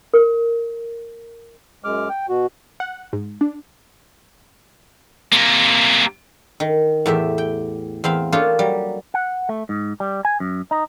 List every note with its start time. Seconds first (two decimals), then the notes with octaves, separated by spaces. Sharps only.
0.14 A#4
1.84 F#2 G#3 D6 F6
2.09 G5
2.29 B2 F#4
2.80 F#5
3.13 G#2
3.41 D4
5.32 C3 A#3
6.60 D#3
7.06 E2 A2 G4 E5
7.38 G5
8.04 E2 C4 F5 B5
8.32 A#3 D4 F4 G4 A4 C#5
8.59 F#3 G3
9.14 F#5
9.49 A3
9.69 G#2
10.00 G3
10.25 G#5
10.40 F#2
10.71 D#4